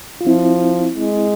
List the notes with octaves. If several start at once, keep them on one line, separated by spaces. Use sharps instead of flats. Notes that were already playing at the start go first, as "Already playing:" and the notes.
F4
F3 C4 E4
G#3